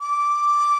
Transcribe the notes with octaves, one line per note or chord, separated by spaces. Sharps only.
D6